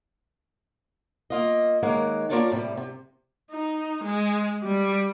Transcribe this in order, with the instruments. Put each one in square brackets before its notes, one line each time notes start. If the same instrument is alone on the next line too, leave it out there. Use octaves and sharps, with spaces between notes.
[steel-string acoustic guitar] A#3 F4 D#5
D#3 G#3 A#3 C#4 F#5
A#3 F4 A#4 C#5 D5 A5
A2 C3 G3
C3
[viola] D#4
G#3
G3